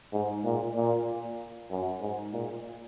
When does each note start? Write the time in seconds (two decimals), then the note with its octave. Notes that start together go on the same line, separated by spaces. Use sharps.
0.12 G#2
0.44 A#2
0.76 A#2
1.71 F#2
2.01 G#2
2.33 A#2